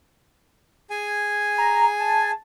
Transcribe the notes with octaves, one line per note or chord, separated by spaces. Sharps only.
G#4 G#5
A#5
A5